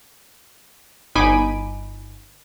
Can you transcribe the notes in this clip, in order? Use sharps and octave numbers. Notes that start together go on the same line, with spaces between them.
G1 D#4 G#5 B5 D6 D#7